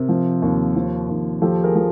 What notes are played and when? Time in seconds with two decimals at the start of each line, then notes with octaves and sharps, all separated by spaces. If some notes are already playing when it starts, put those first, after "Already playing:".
Already playing: C3 A#4
0.09 F3
0.42 D#2
0.76 F3
1.09 D#2
1.42 F3 G4 A4
1.64 G#4 A#4
1.75 F3